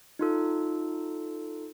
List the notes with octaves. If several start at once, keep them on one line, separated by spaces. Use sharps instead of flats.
D#4 F4 A4